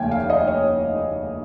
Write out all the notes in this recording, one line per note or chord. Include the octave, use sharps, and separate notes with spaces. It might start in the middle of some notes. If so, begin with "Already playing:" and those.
Already playing: F1 D#2 C#3 C#5 G5 G#5
F5
D#5
C#5